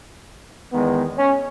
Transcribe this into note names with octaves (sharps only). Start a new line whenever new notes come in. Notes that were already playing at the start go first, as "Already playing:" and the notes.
E2 D#3 G#3 B3
C#4